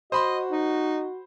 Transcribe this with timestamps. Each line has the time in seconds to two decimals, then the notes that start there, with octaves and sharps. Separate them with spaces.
0.12 F#4 C5 D#5 B5 C6
0.52 D#4